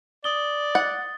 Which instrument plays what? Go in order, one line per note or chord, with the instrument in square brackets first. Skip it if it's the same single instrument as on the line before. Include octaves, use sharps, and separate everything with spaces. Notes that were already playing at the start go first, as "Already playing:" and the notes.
[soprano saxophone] D5 [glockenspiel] D#6 G7
[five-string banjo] F#5 [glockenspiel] A6